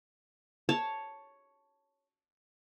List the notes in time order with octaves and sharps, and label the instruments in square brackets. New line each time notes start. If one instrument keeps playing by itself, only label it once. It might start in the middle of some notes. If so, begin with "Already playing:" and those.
[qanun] C#5 A5